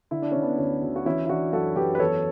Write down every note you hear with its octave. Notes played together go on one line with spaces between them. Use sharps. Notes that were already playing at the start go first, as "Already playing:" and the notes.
D3 E4
D4
D3 C#4
B3 D4
D2 C#4
D2
F#4
E3 C#4 E4
E4
E3 D4 F#4
F#2 F#4 A4
F#2 G4 B4
B4
E2 A4 C#5